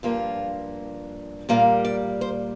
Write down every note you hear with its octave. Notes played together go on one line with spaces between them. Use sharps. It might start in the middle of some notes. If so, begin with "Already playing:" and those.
G2 F3 A#3 D4 F4
A#2 G3 A#3 F4
D5
C5